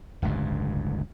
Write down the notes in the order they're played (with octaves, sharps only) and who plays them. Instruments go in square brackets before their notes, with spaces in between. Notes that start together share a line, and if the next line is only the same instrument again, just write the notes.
[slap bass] D1 G1 C#2 G2